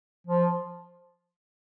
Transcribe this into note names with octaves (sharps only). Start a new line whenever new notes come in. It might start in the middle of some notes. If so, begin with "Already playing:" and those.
F3